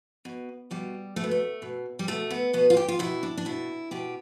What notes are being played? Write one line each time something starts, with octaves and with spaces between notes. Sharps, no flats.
B2
B2 G3
B2 A3
B3
A3
B2
G3
B2 A3
B3
B2 B3
F4
G4
F4
B2 E4
D4
D4
B2 E4
B2 G4